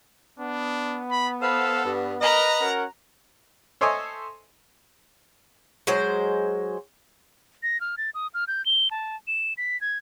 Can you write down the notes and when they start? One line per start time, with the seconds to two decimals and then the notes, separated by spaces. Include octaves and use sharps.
0.39 B3 D4
1.11 B5
1.42 A4 B4 C5 F5
1.85 G2
2.21 A#4 B4 D#5 A#5 F#6
2.60 C#4 F#4 A#4 F#5
3.81 A4 C5 C#5 D#5 E5 G#5
5.87 F#3 G#3 C5
7.63 A#6
7.81 F6
7.98 A6
8.15 D#6
8.34 F6
8.48 G6
8.66 G7
8.91 A5
9.27 E7
9.58 B6
9.81 G#6